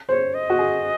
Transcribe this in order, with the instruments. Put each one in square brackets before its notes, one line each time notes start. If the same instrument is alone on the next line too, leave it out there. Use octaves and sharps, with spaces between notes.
[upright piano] C5 [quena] C#5
[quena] D#5
[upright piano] F#4
G#4